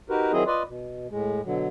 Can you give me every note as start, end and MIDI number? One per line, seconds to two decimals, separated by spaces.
0.10 0.32 63
0.10 0.32 66
0.10 0.32 67
0.10 0.32 70
0.10 0.32 71
0.32 0.44 51
0.32 0.44 54
0.32 0.44 60
0.32 0.44 64
0.32 0.44 68
0.32 0.44 75
0.47 0.63 65
0.47 0.63 71
0.47 0.63 74
0.47 0.63 75
0.68 1.07 47
1.10 1.41 45
1.10 1.41 56
1.44 1.68 47
1.44 1.68 50
1.44 1.68 54